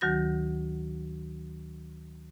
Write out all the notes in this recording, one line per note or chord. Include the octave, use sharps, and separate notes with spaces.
D2 D#3 F#3 F#4 G6 A#6